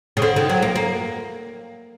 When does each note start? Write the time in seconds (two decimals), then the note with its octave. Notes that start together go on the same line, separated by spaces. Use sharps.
0.17 C#3
0.22 D3
0.36 D#3
0.49 F#3
0.62 A#3
0.76 A#3